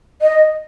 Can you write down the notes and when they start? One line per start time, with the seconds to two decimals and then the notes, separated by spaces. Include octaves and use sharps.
0.21 D#5